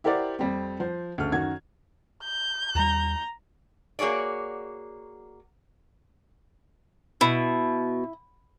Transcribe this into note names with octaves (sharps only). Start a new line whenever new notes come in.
E4 G4 A#4 C5 D5 F#5
F2 G3 C4
F3 C5
D2 C#3 F6
F#2 D#3 F#4 G#6
G6
D#2 G3 A#5
A#3 F#4 G#4 C#5 D5
B2 E4